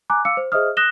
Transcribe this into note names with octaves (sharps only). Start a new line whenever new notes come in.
G#5 A#5 D6 F#6
F5 D6 E6 C#7
C5
G#4 C5 D#5 E5 D#6 F6
D#6 F#6 A#6 E7 G7